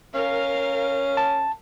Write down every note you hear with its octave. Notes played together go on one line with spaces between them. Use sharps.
C#4 A#4 F5
A5